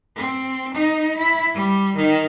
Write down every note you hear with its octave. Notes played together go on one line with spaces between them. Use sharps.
C4
D#4
E4
G3
D#3